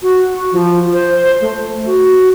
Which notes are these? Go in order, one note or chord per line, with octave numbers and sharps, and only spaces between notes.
F#4
F3
C5
A3
F#4